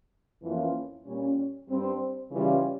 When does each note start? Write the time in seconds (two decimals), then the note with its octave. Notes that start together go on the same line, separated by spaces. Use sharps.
0.43 F2 E3 A#3 C#4 F4
1.06 A#2 G3 C#4
1.69 G2 G3 C4
2.31 C#3 E3 G3 C#4 F4